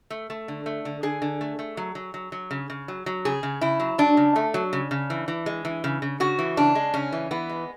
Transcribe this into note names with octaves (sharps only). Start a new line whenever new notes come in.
A3
A3
D3
A3
D3
D3 G#4
D3
A3
A3
F#3
F#3
F#3
F#3
C#3
C#3
F#3
F#3
C#3 G#4
C#3
C#3 E4
F#3
F#3 D4
C#3
A3
F#3
C#3
C#3
E3
E3
G#3
E3
C#3
C#3
C#3 F#4
E3
C#3 D4
G#3
C#3 C#4
E3
E3 B3
G#3